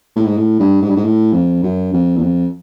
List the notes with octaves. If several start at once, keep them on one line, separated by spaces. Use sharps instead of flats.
A2
G#2
A2
G2
G#2
G2
G#2
A2
F2
F#2
F2
E2
F2